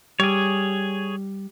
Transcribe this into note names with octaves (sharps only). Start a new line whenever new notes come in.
G3 G#4 C#5